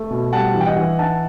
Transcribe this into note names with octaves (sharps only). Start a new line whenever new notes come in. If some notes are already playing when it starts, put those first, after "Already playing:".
Already playing: A3
B2
G3 F#5 A5
E3
G5
D#5 F#5
E3
D#4 F#5 A5